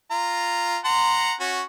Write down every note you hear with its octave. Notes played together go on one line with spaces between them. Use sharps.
F4 A#5
F#5 A#5 C6
C#4 F#4